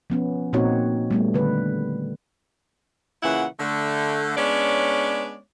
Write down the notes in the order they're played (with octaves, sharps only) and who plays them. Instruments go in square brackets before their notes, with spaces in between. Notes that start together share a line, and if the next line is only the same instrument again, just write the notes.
[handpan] F3 B3 C#4
A#2 A#3 C4 D#4 F#4 C#5
G3 A3 B3
D3 D#3 B4
[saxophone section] A#2 C#3 E3 E4 F#5
D3 A3
G#3 B3 C#4 D4 C#5 D5